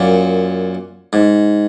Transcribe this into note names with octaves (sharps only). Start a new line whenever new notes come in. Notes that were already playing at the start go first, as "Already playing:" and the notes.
Already playing: F#2 A#2
G#2